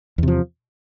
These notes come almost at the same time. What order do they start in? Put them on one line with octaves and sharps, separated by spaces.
E2 C3 F3